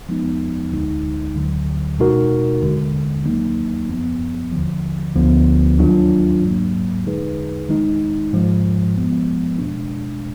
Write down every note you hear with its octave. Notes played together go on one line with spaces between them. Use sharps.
F3 G#3 B3 D#4
D2 D3 G#3 D#4
D2 D3 F#3
B2 G#3 D#4 F#4 A#4
D#2 D3 G#3
D#2 D#3 F#3 A#3 D#4
F#2 F3 B3
D#2 D3 F3
D2 D3 F3 B3
D#2 D#3 F#3 D4 F4
G#2 F#3 A#3
D3 G#3 D#4 G#4 B4
D#3 G#3 D#4
G#2 F3 G#3
F3 G#3 B3
B2 G#3 D4